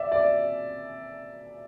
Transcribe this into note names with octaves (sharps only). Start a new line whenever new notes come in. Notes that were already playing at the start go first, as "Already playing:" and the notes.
Already playing: D5 E5
D5